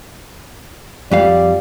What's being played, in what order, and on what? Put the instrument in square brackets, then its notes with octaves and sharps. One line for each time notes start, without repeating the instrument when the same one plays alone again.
[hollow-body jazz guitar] F2 G3 F5 [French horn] D5